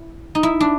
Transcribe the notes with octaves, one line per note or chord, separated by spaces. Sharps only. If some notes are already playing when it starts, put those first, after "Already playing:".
Already playing: E4
D#4
E4
D4